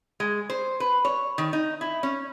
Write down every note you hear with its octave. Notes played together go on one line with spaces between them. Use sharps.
G#3
C5
B4
C#5
D#3
D#4
E4
C#4